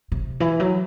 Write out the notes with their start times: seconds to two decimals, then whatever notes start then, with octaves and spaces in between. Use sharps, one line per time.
0.12 C3
0.40 E3
0.60 F#3